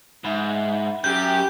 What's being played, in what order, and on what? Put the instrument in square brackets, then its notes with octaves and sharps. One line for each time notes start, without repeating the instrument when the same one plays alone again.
[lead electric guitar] G#2 [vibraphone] E5 F#5 B5
[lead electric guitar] F#2 [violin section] G4 [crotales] G6